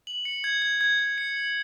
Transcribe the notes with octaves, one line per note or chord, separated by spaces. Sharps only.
F#7
C#7
G#6
G#6
G#6
G#6
C#7
F#7